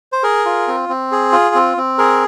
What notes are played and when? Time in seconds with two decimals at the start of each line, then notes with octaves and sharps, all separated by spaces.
0.12 C5
0.23 G#4 A#4
0.46 F4
0.68 C4
0.89 C4
1.12 G#4
1.32 F4
1.55 C4
1.77 C4
1.98 G#4 A#4